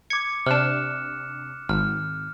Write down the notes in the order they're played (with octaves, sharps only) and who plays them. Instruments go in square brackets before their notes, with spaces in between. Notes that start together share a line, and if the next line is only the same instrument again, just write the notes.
[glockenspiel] D6 C#7 [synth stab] G#6
[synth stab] C3 D4 [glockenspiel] F6 F#6 E7
[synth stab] G#1 [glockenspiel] F6